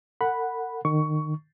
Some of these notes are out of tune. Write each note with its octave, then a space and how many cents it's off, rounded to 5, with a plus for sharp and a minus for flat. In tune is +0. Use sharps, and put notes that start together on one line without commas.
A#4 -45 F#5 +0 B5 -5
D#3 -30 C#6 +15